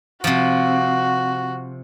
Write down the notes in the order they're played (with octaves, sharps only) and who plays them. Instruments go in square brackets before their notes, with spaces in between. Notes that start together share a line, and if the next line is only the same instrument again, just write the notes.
[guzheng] C3 F3 [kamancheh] F#4